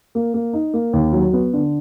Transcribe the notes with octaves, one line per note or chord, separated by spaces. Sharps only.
A#3
A#3
D#4
A#3
D#2
F#3
B3
D3